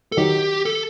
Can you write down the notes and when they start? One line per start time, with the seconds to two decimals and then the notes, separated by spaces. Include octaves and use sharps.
0.12 A4
0.17 D#3 F#3 G4
0.65 A4